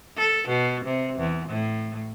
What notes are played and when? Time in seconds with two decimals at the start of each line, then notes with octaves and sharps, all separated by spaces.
0.17 A4
0.48 B2
0.85 C3
1.19 E2
1.49 A2